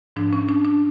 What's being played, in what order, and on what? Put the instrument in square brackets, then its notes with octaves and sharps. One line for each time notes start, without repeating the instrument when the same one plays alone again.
[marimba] G#2 F3 D4
C#4
D4
D4